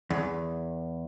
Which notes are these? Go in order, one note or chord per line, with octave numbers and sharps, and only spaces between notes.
E2